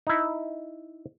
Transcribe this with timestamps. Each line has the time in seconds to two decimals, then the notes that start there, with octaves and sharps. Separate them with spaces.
0.07 D#4 E4